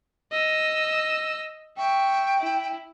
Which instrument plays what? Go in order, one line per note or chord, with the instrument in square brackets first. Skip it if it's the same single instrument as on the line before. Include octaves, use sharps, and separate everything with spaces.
[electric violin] D#5 E6
[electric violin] E5 C#6 [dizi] G5
[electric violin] E4